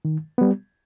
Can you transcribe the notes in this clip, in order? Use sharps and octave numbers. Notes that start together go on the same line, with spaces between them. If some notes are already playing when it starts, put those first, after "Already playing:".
D#3
G3 B3